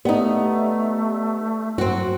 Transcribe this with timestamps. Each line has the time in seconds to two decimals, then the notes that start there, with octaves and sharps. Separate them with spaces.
0.05 A3 B3 D#4 G4 D5
1.78 G2 F#3 C4 F#4